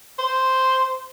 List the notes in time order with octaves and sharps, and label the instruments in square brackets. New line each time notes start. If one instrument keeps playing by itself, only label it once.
[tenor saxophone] C5